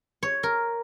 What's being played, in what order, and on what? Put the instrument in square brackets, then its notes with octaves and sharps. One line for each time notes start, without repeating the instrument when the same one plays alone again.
[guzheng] C#5
A#4